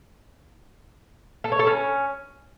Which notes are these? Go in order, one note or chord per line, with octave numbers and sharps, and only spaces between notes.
A4
C#5
A4
C#4